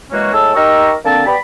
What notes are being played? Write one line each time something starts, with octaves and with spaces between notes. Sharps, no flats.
E3 F#3 G#3 A#3 C#4 F#4
A2 G#3 A5 E6
D#4 G4 A#4 A#5 C#6 E6
D3 A#3 C4 A5
B3 G4 D5 B5